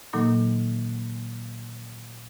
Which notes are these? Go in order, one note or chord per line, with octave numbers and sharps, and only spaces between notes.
A#2 D#3 F#3 A#3 D#4 A4